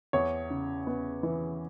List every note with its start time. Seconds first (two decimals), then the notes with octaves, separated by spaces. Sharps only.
0.13 E2 C#5
0.50 C#3
0.87 B3
1.23 E3